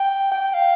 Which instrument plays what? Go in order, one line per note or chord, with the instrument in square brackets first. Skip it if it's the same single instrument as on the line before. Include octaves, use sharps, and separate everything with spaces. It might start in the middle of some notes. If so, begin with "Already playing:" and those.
Already playing: [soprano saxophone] G5
G5
F5